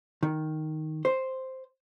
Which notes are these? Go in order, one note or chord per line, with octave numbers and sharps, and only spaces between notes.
D#3
C5